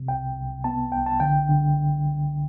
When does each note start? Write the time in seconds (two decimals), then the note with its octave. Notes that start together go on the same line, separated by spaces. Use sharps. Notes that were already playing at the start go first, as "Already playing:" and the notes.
Already playing: C3
0.08 C2 G5
0.36 C2
0.64 B3 A5
0.92 C2 G5
1.06 A5
1.20 D3 G5
1.49 D3